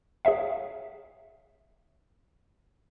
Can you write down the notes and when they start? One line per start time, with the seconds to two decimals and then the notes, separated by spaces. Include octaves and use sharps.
0.25 G#4 C#5 E5 F5